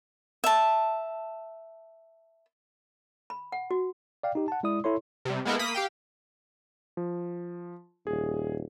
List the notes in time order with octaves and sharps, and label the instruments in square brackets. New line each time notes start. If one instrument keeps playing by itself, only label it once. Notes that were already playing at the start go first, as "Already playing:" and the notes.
[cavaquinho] E5 A5
[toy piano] B5
F#5
F#4
[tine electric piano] D5 F5 G5
D#4 G4
F#5 A5
G#3 E4 D5 D#6
E4 A4 C#5 C6
[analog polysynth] C3 G3
G#3 A#3 B3 E4 A4 A#4
A#3 B5 D#6 B6
G4 F5 G5
[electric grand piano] F3
[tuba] D#1 [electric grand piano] G#4